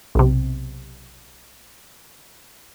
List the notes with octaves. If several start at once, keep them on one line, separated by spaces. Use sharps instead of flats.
B1 C3